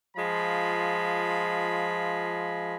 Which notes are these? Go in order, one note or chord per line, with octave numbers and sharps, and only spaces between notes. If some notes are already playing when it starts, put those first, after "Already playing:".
F3 G#3 F4 B5